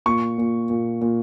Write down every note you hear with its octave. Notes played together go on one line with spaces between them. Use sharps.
A#2 C#6
A#2
A#2
A#2